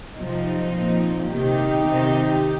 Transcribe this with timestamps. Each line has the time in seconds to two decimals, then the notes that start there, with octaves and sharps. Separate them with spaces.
0.17 C3 F3 C4 D#4
0.73 A#2 F3
1.28 C3 D#3 D#4 G4
1.84 C3 D#3